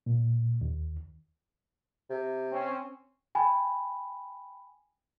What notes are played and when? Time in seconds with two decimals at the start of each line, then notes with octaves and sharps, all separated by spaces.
0.06 A#2
0.61 D#2
2.10 C3
2.51 C4 C#4
3.35 G5 G#5 B5